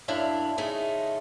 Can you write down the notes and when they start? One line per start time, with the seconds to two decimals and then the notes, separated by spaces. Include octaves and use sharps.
0.08 F#2 D4 E4 F5
0.58 C#3 G#3 A3 D#4